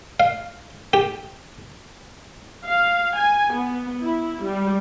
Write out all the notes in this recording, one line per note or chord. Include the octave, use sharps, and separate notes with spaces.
F5
G4
F5
G#5
B3
E4
G3